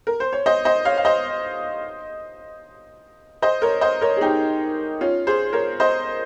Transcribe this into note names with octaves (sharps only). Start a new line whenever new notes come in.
A#4
C5
C#5
C5 D#5
C5 D#5
C#5 F5
F5
C5 D#5
C5 D#5
A#4 C#5
C5 D#5
A#4 C#5
G#4
D#4 G4
C#4 F4
G#4 C5
A#4 C#5
C5 D#5